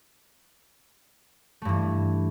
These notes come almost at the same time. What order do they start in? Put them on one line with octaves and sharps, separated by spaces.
A3 G2 E3